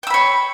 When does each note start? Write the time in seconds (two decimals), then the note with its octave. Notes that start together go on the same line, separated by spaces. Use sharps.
0.03 G5
0.07 E6
0.10 B5
0.14 C#5